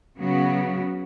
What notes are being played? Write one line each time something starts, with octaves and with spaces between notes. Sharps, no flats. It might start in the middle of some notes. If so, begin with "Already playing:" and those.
C#3 F#3 B3 F#4